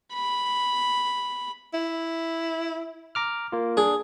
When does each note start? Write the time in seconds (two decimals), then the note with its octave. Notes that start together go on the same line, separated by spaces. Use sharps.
0.14 B5
1.74 E4
3.15 A#5 D6 F6
3.52 A#3 F4
3.77 D4 G#4